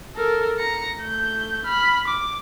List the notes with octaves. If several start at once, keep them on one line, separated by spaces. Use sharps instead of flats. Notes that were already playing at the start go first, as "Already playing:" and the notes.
A4 A#4
A#5 C#7
A3 G6
B5 F6
D6